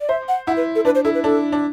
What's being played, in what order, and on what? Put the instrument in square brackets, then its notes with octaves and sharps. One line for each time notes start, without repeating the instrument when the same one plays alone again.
[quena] D5
[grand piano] C5 [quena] E5
[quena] F#5
[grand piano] E4 [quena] F#5
[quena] B4
A4
[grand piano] D4 [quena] B4
[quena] C5
[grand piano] E4 [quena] A4
[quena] B4
[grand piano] D4 [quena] A4
[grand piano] D4